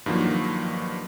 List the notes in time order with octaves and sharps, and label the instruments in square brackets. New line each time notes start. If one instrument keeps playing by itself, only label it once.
[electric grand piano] G2 D#3 F3 F#3 A#3